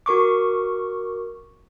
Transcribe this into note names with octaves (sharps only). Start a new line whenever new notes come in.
F#4 A#4 C#6 D6